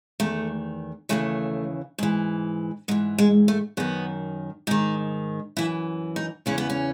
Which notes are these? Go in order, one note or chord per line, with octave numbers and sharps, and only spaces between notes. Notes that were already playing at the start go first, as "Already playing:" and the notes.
E2 D#3 A3
D#2 C#3 E3 A3
G#2 E3
G#2 E3 G#3
G#3
A3
F#2 D#3 B3
G#2 D#3 D#4
F#2 E3 E4
D#4
E2 C#3 E3 C#4
B3
C#4